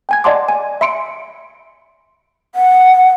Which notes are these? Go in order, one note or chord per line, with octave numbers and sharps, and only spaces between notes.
G5 G#5 G#6
D5 D#5 F#5 A5 C6 D6
G#5
E5 B5 C6 C#7 D7
F#5